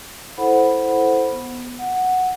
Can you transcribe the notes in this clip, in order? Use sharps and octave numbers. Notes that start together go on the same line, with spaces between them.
E4 A4 C5 F#5 B5
B3
F#5